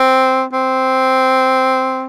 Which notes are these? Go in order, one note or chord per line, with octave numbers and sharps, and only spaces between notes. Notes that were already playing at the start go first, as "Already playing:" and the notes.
Already playing: C4
C4